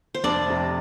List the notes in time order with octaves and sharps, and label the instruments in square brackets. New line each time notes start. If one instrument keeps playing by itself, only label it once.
[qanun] C5
[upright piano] F1 [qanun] D4 D5
[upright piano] F2 C3